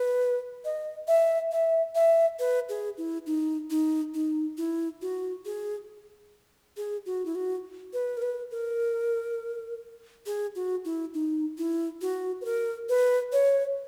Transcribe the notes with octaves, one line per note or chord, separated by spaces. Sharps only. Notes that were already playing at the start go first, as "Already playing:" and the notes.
Already playing: B4
D#5
E5
E5
E5
B4
G#4
E4
D#4
D#4
D#4
E4
F#4
G#4
G#4
F#4
E4
F#4
B4
A#4
B4
A#4
G#4
F#4
E4
D#4
E4
F#4
B4
A#4
B4
C#5